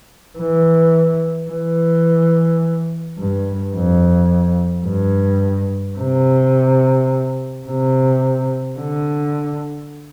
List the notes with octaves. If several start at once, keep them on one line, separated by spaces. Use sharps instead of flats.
E3
E3
G2
F2
G2
C3
C3
D3